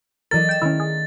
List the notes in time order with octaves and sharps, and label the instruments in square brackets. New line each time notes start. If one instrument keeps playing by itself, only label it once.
[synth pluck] E3 F#3 A#4 [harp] A4 D5 D#5 [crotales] A6
[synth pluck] G5 E7
[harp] D#3 A3 A#4 [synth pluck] C#4 E4
[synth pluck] G#4